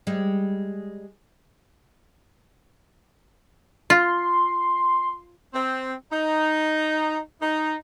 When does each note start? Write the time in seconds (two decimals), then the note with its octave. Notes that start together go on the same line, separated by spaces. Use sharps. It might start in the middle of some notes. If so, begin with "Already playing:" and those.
0.07 G3 G#3
3.90 F4 C6
5.54 C4
6.12 D#4
7.42 D#4